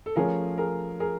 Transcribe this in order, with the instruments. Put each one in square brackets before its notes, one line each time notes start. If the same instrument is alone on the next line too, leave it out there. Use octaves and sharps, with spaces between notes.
[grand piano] A4
[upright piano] F3 A3 C#4 [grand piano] G#4 A#4
[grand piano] G#4 A#4
G#4 A#4